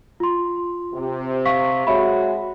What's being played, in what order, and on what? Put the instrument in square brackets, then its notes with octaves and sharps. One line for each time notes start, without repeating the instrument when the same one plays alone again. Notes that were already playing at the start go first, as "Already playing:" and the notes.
[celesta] F4 C6
[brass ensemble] C3
[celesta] F5 C#6 B6
[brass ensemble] G#3 F#4 [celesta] C#5 E5 B5